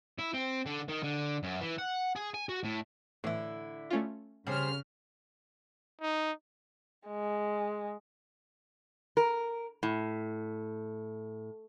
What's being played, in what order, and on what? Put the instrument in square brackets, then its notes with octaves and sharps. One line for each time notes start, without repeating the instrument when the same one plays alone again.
[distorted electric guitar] E4
C4
D3
D#3
D3
F#2
E3
F#5
G#4
G#5
F#4
A2
[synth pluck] A2 E3 [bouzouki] D3 E4
[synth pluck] A3 C#4 F4
[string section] C#3 F6 [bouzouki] G3 G#4 C5
[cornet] D#4
[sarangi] G#3
[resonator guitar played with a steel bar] A#4
A2